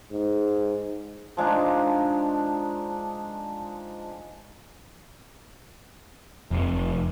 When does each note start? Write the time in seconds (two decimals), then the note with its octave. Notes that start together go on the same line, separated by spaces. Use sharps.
0.12 G#2
1.37 F3 G#3 D4 D#4
6.51 F1